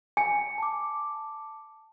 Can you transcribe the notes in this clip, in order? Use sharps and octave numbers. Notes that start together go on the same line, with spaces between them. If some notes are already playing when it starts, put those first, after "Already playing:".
G#5 C#7
A5 D6